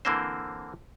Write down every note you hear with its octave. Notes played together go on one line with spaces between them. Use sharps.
D3 E3 A#3 C4 C5